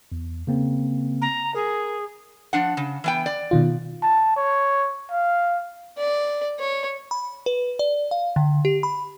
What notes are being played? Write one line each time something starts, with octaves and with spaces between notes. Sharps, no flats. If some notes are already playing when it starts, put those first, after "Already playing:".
E2
C#3 A#3 C4
A#5
G#4 A#4
F3 D4 F#5
C#3
E3 B3 G5
D5
B2 D#3 F4
A5
C#5
F5
D5
C#5
B5
B4
D5
F5
D3
G4
B5